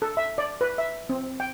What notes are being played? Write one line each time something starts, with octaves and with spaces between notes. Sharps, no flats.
A4
E5
D5
B4
E5
C4
G5